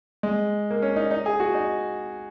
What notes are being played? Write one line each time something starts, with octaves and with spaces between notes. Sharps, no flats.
G#3
A#3
C#4
D#4
D#4
G#4
F#4
D#4